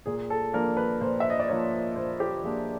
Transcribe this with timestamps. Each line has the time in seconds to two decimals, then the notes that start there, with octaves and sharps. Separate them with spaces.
0.06 A#2 G#4
0.30 A4
0.53 F3 A#3 D4 A#4
0.77 B4
1.01 A#2 C5
1.20 E5
1.30 D#5
1.40 D5
1.48 F3 A#3 D4 C#5
1.96 A#2 C5
2.20 G4
2.43 F3 A#3 D4 G#4